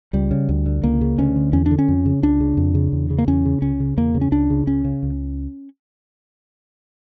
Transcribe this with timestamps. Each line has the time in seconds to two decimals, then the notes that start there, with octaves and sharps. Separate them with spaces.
0.13 C#2 G3
0.31 C#3
0.49 D2
0.66 D3
0.83 C#2 A#3
1.01 C#3
1.18 D2 C#4
1.36 D3
1.53 E2 C#4
1.66 D4
1.71 D3
1.79 C#4
1.88 F2
2.06 C#3
2.23 C#2 D4
2.40 C#3
2.57 F2
2.75 C#3
2.92 E2
3.10 C#3
3.18 A#3
3.27 E2 C#4
3.45 C#3
3.62 C#2 C#4
3.80 C#3
3.97 E2 A#3
4.15 C#3
4.21 C#4
4.31 C#2 D4
4.50 C#3
4.67 C#2 C#4
4.85 C#3
5.03 C#2